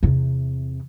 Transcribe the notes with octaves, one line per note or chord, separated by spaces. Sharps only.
E2 C3